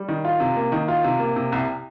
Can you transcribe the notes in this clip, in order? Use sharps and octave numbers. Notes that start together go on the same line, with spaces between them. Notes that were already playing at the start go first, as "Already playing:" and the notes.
Already playing: G3
D#3
F4
C3
A#3
D#3
F4
C3
A#3
C3
C2